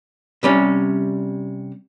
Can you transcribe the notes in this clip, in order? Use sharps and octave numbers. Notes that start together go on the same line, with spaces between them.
C3 G3 C#4